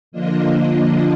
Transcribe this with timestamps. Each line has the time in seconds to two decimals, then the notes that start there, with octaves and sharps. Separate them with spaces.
0.12 D3 F3 A#3 D4 F4 D#5